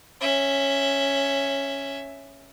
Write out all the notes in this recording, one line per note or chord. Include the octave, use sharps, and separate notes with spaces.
C#4 E5